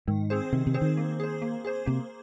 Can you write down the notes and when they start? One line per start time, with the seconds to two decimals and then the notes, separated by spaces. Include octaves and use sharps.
0.07 G#2 D#3
0.30 C4 G#4 C5
0.53 C3 D#3
0.67 C3
0.74 C4 G#4 C5
0.82 D#3
0.97 A#3
1.20 G#4 C5
1.42 A#3
1.65 G#4 C5
1.86 C3 A#3